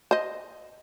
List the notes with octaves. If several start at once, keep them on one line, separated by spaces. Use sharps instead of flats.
C5 D#5